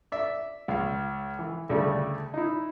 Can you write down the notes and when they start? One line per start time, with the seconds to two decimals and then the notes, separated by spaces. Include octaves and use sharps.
0.12 D5 E5
0.68 C#2 F5
1.39 E3
1.69 D2 C#3 G3 A3
2.34 D#4 E4